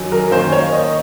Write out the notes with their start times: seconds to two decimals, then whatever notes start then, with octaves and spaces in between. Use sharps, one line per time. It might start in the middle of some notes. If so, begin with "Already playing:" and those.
Already playing: F#2 D#3 F#3 C#4
0.12 A#4
0.32 D#3 A#3 C#4 C5
0.52 C#5
0.72 D#5